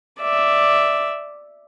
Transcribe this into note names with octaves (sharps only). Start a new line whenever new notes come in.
D5 E5